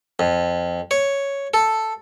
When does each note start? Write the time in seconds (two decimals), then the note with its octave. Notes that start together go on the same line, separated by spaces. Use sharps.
0.19 F2
0.91 C#5
1.54 A4